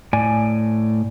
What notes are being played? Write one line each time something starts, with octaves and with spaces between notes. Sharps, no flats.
A2 D5 G#5